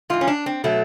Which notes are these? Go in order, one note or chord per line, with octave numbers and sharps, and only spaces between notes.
G#2 E3 F4
C#4
D4
C4
B2 F#3 A3